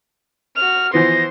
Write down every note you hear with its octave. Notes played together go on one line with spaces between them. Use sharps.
F#4 F6 F7
E3 F3 B3 C5 C6 A#6